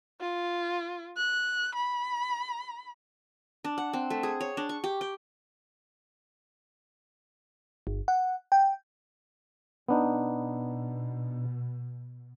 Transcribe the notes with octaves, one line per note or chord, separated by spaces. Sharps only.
F4
F#6
B5
D4
F#5
C4
A3
G#4
C#5
D4
C#6
G4
G5
G1
F#5
G5
B2 B3 D4 D#4